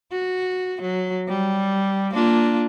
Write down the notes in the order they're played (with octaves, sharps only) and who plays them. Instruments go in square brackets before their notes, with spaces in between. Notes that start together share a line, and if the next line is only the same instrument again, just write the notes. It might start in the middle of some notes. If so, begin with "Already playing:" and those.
[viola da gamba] F#4
F#3
G3
A#3 D4 F4